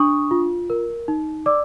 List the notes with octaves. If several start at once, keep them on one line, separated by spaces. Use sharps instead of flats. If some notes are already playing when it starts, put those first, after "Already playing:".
Already playing: D4 C#6 D#6
F4
A#4
D#4
D5 D6 E6